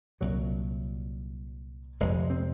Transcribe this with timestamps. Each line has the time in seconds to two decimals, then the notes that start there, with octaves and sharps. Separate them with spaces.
0.21 C2 A#2 F#3
2.00 F1 F2 C3 G#3
2.30 C4